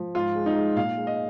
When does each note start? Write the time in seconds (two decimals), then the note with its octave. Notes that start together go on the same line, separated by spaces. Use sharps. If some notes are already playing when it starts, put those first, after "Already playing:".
Already playing: F3
0.14 G#2 F4
0.35 G#3
0.46 D#4
0.56 G#3
0.76 A#2 F5
0.97 G#3
1.07 D#5